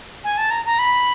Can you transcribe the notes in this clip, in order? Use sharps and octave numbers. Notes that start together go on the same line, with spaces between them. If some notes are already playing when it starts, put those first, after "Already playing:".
G#5
A5
A#5
A#5
B5